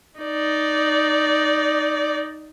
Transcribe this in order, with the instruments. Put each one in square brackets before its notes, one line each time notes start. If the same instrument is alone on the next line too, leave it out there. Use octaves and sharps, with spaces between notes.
[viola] D#4 D5